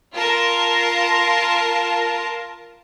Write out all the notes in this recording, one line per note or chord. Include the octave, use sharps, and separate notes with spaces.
F4 A#4 A5